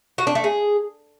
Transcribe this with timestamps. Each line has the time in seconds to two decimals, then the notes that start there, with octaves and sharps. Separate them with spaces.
0.18 F#4
0.27 D4
0.35 A3
0.44 G#4